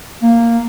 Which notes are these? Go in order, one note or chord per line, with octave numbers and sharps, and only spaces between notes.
A#3